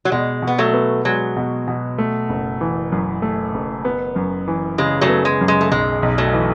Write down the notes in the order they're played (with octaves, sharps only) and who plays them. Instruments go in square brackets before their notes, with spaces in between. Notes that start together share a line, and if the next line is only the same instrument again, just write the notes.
[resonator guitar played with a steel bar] F#3
[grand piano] B2 [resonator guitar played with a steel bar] G#3
[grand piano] B2
[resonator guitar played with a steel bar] B3
F#3 A3
[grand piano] B3
[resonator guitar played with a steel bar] F#3 [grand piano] G#3
[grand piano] B2
B2
A3
F#1
E3
F#2
A3
F#1
B3
F#2
E3
[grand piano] C#3 [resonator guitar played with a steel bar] G#3
[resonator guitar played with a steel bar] F#3 A3
[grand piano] B3
[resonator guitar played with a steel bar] G#3
[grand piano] F#2
[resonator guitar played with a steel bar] G#3
A3
[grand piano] B1 [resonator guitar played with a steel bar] G#3
[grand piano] B1
[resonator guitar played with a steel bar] F#3 A3
[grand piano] E3